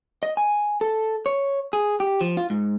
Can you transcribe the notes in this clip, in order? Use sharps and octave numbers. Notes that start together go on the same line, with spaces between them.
D#5
G#5
A4
C#5
G#4
G4
F3
F4
G#2